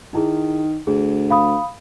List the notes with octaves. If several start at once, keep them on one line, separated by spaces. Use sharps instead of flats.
D#3 D#4 E4 G#4
D2 G#4
F5 B5 D#6